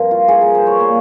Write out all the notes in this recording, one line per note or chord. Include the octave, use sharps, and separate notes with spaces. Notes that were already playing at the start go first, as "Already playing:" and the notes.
Already playing: G2 F3 C4 A#4
F4
G#4
A#4
C5
C#5
A#2 G3 A#3